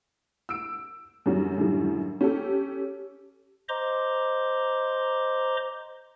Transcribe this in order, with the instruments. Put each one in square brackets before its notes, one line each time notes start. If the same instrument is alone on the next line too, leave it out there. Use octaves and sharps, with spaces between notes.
[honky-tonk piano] E6 D7
F#2 D3 F#3 G3 C#4
F#2 A2 D3 D#3 G3
C#4 G4 A4
[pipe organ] C5 D#5 A#5 C6 D6